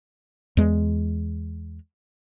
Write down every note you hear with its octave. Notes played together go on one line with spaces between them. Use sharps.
E2 G#3